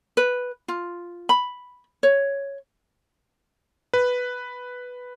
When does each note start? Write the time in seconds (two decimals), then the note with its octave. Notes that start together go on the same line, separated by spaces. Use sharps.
0.17 B4
0.68 F4
1.29 B5
2.03 C#5
3.94 B4